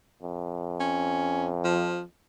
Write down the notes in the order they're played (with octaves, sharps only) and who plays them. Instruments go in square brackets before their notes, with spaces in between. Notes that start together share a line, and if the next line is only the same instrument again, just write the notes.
[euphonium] F2
[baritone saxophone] C#4
F3